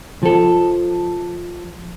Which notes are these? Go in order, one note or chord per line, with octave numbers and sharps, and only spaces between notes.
F3 A4